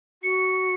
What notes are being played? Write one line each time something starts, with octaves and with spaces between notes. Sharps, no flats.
F#4 C#7